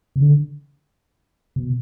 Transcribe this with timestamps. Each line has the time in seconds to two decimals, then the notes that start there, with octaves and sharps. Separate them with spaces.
0.16 C3
0.20 D3
1.56 B2